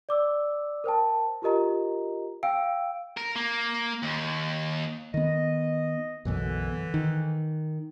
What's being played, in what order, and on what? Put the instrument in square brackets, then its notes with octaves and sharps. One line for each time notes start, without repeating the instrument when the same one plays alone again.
[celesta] D5 D6 E6
A#4 C5 G5 A5
F4 G4 A#4 D#5 A#5
F5 G5 E6 D7
[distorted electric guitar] A#4
A#3
D#2
[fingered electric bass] D#3 B3 [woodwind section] D#5
[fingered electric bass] B1 F#2 B2 [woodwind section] D3 E3
[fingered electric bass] D#3